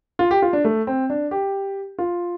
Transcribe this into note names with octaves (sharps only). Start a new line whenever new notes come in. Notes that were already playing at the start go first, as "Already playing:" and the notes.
F4
G4
F4
D4
A3
C4
D4
G4
F4